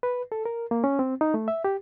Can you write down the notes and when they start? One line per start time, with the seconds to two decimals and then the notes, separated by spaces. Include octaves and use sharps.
0.03 B4
0.32 A4
0.45 A#4
0.71 A#3
0.84 C#4
0.99 C4
1.21 D#4
1.34 A3
1.48 E5
1.64 G4